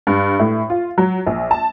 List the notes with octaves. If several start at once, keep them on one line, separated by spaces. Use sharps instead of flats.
G2
A2
F4
F#3
A#1
A5